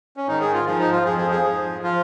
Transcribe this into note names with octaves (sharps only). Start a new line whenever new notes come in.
C#4
G#2 D#3 D#4
G#4
F4
G#2 F3 G#4
D#4
F4
F2 F3 G#4
G#4
G#4
G#2 F3
F3 F4